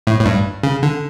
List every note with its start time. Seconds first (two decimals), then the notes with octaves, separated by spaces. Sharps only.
0.07 A2
0.21 A2
0.26 G2
0.63 C#3
0.83 D3